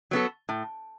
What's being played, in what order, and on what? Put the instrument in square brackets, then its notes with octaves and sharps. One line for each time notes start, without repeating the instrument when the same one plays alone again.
[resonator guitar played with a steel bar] F#3 B3 F#4 A4
A2